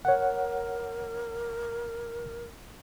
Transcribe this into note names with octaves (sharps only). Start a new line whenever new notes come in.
A#4 C#5 F#5